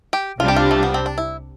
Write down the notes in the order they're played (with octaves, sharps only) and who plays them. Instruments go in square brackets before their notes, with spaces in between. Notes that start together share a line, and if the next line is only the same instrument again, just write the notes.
[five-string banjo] G4
[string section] C2 C3 G3 D4 [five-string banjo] F4
[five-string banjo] G4
F4
A3
B3
C4
D4
E4